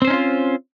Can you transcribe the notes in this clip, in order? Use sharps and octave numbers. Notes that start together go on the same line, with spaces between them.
C4 C#4 D#4 F4 C5